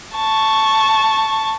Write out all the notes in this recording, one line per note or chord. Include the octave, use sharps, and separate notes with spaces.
A5 C#6